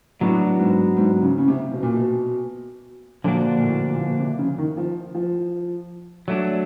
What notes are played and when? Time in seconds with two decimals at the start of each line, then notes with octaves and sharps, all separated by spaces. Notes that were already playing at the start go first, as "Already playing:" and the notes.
0.20 A2 F#3 B3 D4 F#4
0.59 G#2
0.97 G#2
1.22 C#3
1.38 C#3
1.48 C3
1.73 B2
1.83 A#2
1.93 B2
3.24 A#2 D3 F3 A#3 D4 F#4
3.58 A#2
3.62 A2
3.93 A#2
4.01 B2
4.19 C3
4.39 C#3
4.58 D#3
4.77 F3
5.15 F3
6.28 F#3 A3 D4